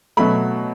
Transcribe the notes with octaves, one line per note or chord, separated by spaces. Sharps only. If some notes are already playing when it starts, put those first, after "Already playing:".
B2 F#3 A3 B5